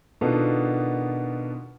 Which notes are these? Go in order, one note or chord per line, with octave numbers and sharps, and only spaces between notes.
B2 D#3 B3 D4 F4 A4